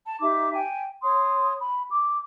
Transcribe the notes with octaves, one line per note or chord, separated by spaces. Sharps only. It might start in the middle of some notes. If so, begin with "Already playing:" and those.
A5
D#4 G4 E5 D6
G5 G#5
C#5 C6 D#6
B5
D6